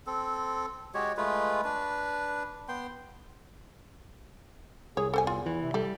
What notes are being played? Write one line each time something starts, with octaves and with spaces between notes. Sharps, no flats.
C4 A4
G#3 F#4 G4 C#5
G#3 A3 F4 B4
D4 B4
B3 G5 C6
C2 G#4 C#5
E2 A4 C5 G#5
F4
E3
C3
G3 A4